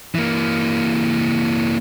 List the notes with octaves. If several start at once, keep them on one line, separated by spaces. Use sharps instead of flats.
E3 A#3